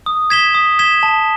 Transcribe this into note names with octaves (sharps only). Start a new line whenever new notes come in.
D#6
G#6 B6 E7 G7
D#6
G#6 B6 E7 G7
A5